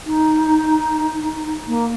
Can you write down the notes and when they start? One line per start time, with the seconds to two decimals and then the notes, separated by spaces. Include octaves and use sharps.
0.06 D#4
1.68 A#3